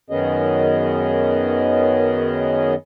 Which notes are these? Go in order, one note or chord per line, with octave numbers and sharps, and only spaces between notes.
F#2 D#3 B3 C#4 G#4 D#5